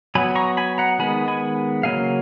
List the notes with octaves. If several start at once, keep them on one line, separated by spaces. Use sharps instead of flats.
F#3 B3 G#5 B5
A#5 C#6
G#5 B5
F#5 A#5
D#3 G#3 B3 G#5 B5
G#5 B5
C#3 F#3 A#3 C#4 F5 G#5